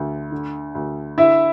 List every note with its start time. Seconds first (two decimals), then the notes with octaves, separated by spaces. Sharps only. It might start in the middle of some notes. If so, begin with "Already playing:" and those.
Already playing: D2 D3
0.32 D3
0.75 D2
1.17 D3 E4 E5